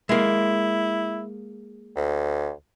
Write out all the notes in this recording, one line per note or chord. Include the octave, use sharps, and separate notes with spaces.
G#3 A#3 E4
D2